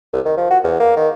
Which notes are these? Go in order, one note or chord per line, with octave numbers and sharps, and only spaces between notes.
C2
D#3
F3
F#4
E2
A#3
D#3